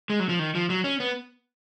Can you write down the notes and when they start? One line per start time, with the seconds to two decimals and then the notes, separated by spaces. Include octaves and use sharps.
0.10 G#3
0.20 F#3
0.29 F3
0.39 D#3
0.55 F3
0.70 F#3
0.84 C#4
1.00 B3